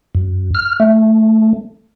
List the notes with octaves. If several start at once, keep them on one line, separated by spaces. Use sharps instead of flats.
F#2
F6
A3